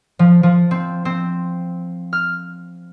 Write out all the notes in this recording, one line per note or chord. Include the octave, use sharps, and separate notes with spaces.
F3
F3
C4
C4
F6